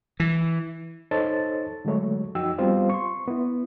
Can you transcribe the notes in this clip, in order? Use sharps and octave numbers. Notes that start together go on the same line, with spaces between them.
E3
D#4 A4 C5 C#5 A5 A6
D3 F#3 G#3 A3 C#5
F#2 F3 D#4 F#4 G5 E6
G3 B3 C4 F4 C5 F5
C6 C#6
B3 E4